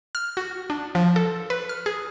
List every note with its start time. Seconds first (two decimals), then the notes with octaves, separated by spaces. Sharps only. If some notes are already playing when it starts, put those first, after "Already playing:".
0.15 F6
0.37 F#4
0.70 D4
0.95 F3
1.16 A4
1.50 B4
1.69 F6
1.86 G#4